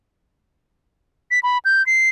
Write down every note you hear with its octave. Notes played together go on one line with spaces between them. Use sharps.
B6
B5
G6
C7